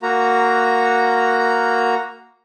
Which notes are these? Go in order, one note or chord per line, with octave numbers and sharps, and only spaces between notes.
A#3 F#4 A#5